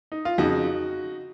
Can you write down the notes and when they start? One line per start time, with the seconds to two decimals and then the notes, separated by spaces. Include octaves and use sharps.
0.12 D#4
0.25 F4
0.38 F2 C#3 D#4 F#4